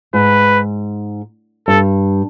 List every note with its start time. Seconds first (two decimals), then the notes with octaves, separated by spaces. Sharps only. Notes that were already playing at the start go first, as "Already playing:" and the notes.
0.14 G#2 B4
1.68 G2 A4